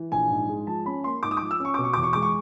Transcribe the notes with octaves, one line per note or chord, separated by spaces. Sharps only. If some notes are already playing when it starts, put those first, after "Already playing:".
Already playing: E3
A#1 G#5
G#2
G#3
F3 A5
C#4 B5
A#3 C6
G#2 D6
D#6
F3 D6
E6
C#4
C#6
B2 D6
C#6
E2 D6
C#6
G#3 D6
C#6